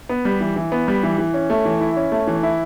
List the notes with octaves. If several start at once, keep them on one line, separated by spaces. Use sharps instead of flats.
B3
G3
E3
E3
B3
G3
E3
E3
C#4
A3
E3
E4
C#4
A3
E3
E4